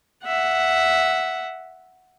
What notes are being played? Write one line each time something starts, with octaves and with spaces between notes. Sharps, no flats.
E5 F#5